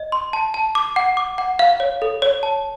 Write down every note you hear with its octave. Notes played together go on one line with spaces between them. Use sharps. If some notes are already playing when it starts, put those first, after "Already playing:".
Already playing: D#5
C6
A5
A5
D6
F#5
D6
F#5
F5
C#5
A4
C#5
A5